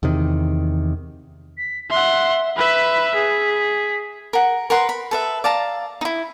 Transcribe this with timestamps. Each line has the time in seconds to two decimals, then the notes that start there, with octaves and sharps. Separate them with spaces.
0.03 E2 C3 D#3
1.58 B6
1.90 E5 F#5 C6
2.57 B4 E5 B5
3.15 G#4 B6
3.54 B6
4.33 A#4 F#5
4.70 A#4 B4 F#5 C6
4.89 B5
5.11 A4 B4 E5
5.44 D5 F5 A5 A#5
6.01 D#4 E4